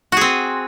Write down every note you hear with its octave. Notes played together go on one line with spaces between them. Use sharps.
C4 F#4 G#4